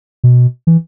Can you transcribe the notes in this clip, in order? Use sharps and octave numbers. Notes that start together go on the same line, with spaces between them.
B2
E3